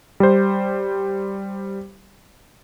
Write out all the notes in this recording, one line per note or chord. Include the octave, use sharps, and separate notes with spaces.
G3 C5